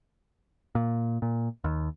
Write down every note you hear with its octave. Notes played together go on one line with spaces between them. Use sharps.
A#2
A#2
D#2